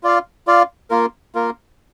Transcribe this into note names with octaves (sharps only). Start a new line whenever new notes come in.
F4 D5 F5
F4 D5 F5
A#3 F4 A#4
A#3 F4 A#4